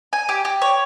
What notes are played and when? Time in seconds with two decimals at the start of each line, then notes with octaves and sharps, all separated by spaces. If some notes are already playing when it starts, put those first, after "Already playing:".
0.13 G#5
0.29 G4
0.45 G4
0.62 C#5